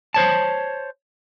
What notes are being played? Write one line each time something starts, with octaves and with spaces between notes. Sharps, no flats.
C5 C#5 A5